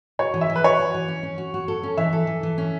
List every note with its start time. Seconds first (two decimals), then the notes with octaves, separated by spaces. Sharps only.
0.19 F#4 C#5
0.34 E3
0.41 E5
0.49 E3
0.55 B4
0.64 F#4 C#5
0.79 F#4
0.94 E3
1.08 C#4
1.23 C#4
1.38 F#4
1.54 F#4
1.68 A4
1.83 C#4
1.97 E3 E5
2.13 A4
2.27 E3
2.43 E3
2.58 C#4